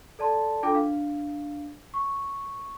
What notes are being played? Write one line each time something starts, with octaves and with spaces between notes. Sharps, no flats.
A4 D5 A5 C6
D4 F4 A4 G5 D6
D4 F5
C#6